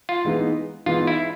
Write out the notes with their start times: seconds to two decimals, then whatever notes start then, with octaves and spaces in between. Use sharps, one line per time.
0.09 F4
0.25 E3 G#3 B3 D#4
0.86 E3 G#3 B3 D#4 F4
1.07 E4